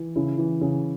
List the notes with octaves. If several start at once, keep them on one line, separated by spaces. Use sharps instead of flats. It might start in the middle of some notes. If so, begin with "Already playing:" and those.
Already playing: E3
C#3 E4
E3
C#3